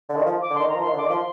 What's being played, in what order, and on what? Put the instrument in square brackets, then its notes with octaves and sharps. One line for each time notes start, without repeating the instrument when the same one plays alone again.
[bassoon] D3
D#3
F3
[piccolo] D6
[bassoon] D3
[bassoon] D#3 [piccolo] C6
[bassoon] D#3 [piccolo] A#5
[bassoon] F3
[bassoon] D#3 [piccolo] C6
[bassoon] D3
[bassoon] D#3 [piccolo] D6
[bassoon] F3 [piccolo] C6